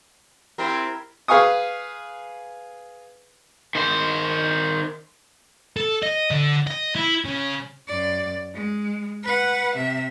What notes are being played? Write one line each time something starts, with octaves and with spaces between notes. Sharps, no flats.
C4 E4 G4 A#4
G#4 B4 F5 G#5 C#6 D#6
D#3 C5
A4
D#5
D3
D#5
E4
C#3
F#2 D5
G#3
B4 F#5
C3 E5